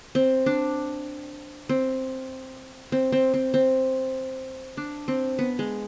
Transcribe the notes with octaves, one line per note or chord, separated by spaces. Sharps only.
C4
D4
C4
C4
C4
C4
C4
D4
C4
B3
G#3